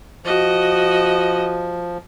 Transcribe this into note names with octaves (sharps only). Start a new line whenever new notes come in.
F3 F#4 D#5